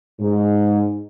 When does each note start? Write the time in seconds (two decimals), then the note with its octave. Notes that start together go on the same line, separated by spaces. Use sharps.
0.20 G#2